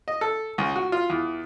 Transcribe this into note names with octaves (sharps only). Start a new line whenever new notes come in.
D#5
A4
C#2
F#4
F4
E2